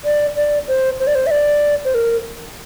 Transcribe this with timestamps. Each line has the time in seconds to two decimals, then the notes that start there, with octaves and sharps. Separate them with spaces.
0.05 D5
0.36 D5
0.68 C5
1.00 C5
1.07 D5
1.15 C5
1.27 E5
1.31 D5
1.85 C5
1.95 A#4